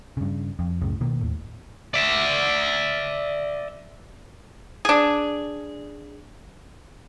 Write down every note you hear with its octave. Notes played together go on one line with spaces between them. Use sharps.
G2 C#3
F2
C#2 F#2 A2 C#3
B2 D#3 A#3
D#2 A2
D5 E5
D4 G#4